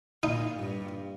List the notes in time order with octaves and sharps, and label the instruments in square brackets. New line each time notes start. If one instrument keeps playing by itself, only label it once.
[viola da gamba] A#2 [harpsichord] D#4
[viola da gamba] G2